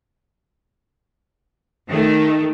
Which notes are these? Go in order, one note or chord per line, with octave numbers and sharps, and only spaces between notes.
D#3 A3